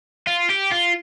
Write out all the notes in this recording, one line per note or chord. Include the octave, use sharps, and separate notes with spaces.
F4
G4
F4